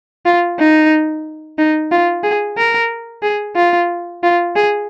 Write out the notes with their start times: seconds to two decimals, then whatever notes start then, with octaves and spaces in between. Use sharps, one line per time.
0.26 F4
0.59 D#4
1.58 D#4
1.92 F4
2.23 G#4
2.58 A#4
3.23 G#4
3.56 F4
4.23 F4
4.56 G#4